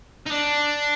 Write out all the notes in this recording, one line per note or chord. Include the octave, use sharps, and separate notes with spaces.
D#4
D4